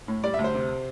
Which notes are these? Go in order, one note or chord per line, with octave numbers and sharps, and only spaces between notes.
A2
G3 D5
E5
D2
C5
C3